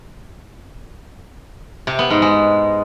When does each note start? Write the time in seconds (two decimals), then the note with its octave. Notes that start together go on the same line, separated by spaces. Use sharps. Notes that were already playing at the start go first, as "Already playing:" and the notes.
1.87 C3
1.99 B3
2.10 G#2
2.22 G#3